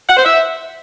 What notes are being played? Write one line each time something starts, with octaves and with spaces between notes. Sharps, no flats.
F#5
C5
E5